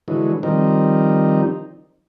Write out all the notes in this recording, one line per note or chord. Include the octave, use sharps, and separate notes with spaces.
D3 E3 F#3 G#3
D#3 F3 G3 C4 D#4